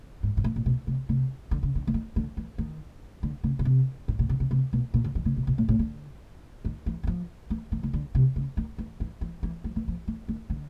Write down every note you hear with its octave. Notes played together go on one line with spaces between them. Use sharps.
G#2
G#2
A2
A#2
B2
C3
C3
D3
C#3
D3
D3
D#3
D3
E3
D#3
D3
C#3
C#3
C3
A2
A#2
C3
C3
C3
B2
A#2
D3
D#3
C#3
B2
B2
A#2
A2
D3
D#3
E3
E3
F3
E3
D#3
C#3
D3
C3
C#3
D#3
E3
E3
E3
E3
F3
E3
F3
E3
D#3
D3